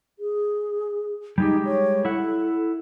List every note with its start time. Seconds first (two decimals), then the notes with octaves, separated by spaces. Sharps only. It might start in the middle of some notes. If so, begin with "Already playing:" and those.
0.19 G#4
1.38 G3 G#3 D#4 G4
1.65 C#5
2.05 E4 A4 F#5